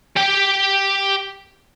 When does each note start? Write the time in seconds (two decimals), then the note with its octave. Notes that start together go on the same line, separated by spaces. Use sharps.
0.16 G4 G5